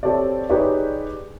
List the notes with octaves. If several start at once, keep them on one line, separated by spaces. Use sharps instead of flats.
C4 G4 A4 C#5 D5
D#4 G4 G#4 B4 C#5 D5